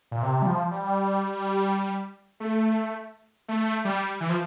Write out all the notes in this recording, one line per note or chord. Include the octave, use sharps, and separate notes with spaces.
A#2
C3
G3
F3
G3
A3
A3
G3
E3
F3